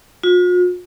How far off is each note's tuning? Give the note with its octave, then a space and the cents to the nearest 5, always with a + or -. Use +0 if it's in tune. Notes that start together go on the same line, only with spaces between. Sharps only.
F4 +45